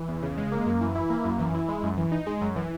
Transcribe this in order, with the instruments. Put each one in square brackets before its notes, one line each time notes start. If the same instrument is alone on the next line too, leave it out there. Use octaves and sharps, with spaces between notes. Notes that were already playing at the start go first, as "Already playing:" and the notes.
Already playing: [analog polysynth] E3
E2
C#3
G#3
A#3
F#2
E3
E4
A#3
F#2
E3
E4
G#3
F#2
E3
D#4
G#3
F#2
E3